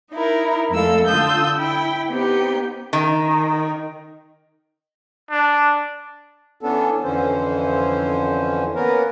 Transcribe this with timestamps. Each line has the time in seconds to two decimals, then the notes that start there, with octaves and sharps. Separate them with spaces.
0.12 D#4 E4 A#4
0.71 F2 G#3 A3 A4 F5 E6
1.06 D3 F4 A5 D#6 E6 G6
1.57 E4 G5 B5
2.08 B3 C4 D#4 G4
2.93 D#3
5.30 D4
6.61 E3 B3 C#4 D4 A4
7.04 F2 D3 E3 C#4 C5
8.75 A#3 B3 C#4 A#4 B4